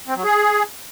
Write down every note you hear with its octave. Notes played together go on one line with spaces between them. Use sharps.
C4
F#3
G#4